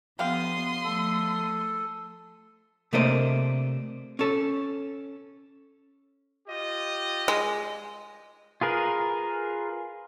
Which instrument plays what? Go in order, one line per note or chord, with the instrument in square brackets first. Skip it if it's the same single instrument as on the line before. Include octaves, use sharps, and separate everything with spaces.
[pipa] D3 G4 F5 [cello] F3 B3 [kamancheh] C6 D#6
[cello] F3 A3 [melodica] A4
[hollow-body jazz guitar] C3 A3 A#3 D4 C5 D#5
C#4 A4
[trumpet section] F4 G4 D#5
[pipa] G#3
[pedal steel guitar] F4 G#4 A#4 B4